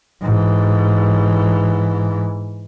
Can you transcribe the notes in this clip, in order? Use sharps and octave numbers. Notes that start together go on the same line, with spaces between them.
G#2 E3